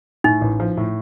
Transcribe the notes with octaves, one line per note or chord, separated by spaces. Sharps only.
A2 D#4
A1
F3
A2